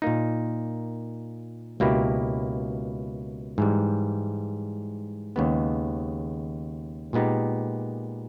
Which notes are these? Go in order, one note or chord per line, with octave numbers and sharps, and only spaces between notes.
A#2 A#3 D#4
C#2 B2 A#3 E4 G4
G#2 E3 G3
D#2 C#3 G#3 B3
A#2 G#3 B3 D#4 G4